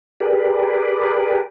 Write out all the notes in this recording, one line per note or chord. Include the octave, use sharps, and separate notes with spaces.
G4 G#4 A#4 B4 D5